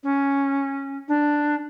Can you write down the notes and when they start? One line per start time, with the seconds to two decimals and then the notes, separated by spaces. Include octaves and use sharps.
0.03 C#4
1.08 D4